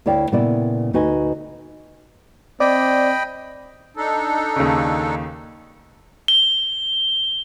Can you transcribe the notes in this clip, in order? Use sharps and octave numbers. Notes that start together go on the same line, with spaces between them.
D2 E4 C#5 D5 F5 G5
A#2 C#3 B3 E4 D5
D2 D#4 F#4 B4 D#5 G#5
C4 D5 D#5 G5 B5
D4 D#4 A4
D#2 C#3
G7